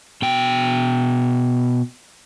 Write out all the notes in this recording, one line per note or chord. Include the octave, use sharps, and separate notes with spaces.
B2 G5